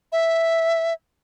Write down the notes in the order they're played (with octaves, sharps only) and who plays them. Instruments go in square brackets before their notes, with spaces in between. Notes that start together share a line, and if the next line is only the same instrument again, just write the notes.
[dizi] E5